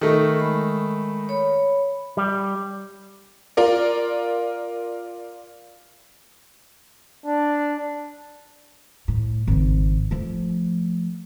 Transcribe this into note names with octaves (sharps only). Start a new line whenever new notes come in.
D#3 A3 D#4
G#3 B5
C#5 B5
G3
F4 A#4 D5
D4
A2
G#1 C#3
F3 A3